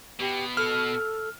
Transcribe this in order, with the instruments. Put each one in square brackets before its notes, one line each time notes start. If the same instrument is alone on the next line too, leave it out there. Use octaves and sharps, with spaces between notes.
[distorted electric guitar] B2 [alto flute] G4
[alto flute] A4 [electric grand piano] F6